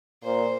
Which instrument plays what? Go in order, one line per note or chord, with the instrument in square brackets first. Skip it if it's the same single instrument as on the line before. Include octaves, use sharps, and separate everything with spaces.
[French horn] A#2 [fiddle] C5